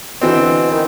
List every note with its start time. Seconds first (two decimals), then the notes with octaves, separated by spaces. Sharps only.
0.21 B2 D3 E3 C4
0.71 D#3